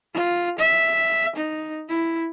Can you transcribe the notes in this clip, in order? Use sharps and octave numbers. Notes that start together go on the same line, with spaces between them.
F4
E5
D#4
E4